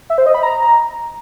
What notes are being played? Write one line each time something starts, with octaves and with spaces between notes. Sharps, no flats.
E5
C5
D#5
B5
A#5